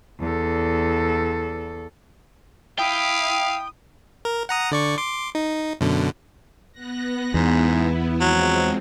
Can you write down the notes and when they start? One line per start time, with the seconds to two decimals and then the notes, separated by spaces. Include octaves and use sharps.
0.20 E2 A4
2.79 E4 F5 G5 D#6
4.25 A#4
4.49 F#5 A#5 D#6
4.71 D3 D5 C#6
4.98 C6 D6
5.35 D#4
5.81 F#2 B2 D3
6.72 B3 F#6 A#6
7.34 E2 G#2 B3 E4
8.21 F3 F#3 G#3 C4